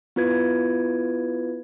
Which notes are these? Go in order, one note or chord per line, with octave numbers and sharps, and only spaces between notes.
B3 E4 F4 B4 G#6